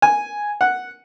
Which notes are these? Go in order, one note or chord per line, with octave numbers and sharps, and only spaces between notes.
G#5
F#5